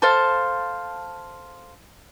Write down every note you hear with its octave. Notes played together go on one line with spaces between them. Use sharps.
A4 C5 F5 A5